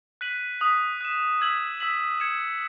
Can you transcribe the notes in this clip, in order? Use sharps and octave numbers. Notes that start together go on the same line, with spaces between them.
F#6 B6 D#7 F#7
D#6 F#6 B6 F#7
F#6 B6 E7
E6 G#6 B6 F#7
E6 B6 F#7
G#6 C#7 E7